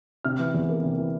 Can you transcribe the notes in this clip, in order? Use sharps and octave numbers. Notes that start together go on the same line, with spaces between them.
C3 F6
E3
E2
A#3
C3
E3